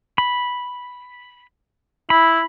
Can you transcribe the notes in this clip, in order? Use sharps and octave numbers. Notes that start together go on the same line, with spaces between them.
B5
E4 B5